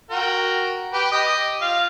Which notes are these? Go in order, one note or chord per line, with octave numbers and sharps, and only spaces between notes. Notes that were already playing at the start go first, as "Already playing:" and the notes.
F#4 A#4 G5
G4 B4 G5
G4 D#5 D#6
F4 F5